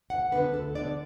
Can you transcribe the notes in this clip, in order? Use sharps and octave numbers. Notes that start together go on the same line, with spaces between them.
D2 F#5
D3 B3 D4 B4
D2 A4
D3 B3 D4 D5